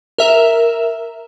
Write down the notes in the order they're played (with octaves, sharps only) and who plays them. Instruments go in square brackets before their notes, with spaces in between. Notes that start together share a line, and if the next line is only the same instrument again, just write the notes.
[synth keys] A#4 E5 E7